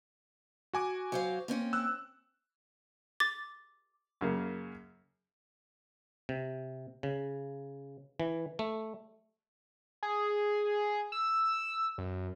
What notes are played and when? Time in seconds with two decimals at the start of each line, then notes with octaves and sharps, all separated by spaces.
0.73 F#4 G#5 D6
1.12 F#3 C5 F5
1.48 A#3 C4 C#4
1.73 E6 F#6
3.20 D6 A6
4.21 F#2 C#3 A#3
6.29 C3
7.03 C#3
8.20 E3
8.59 A3
10.03 G#4
11.12 E6
11.98 F#2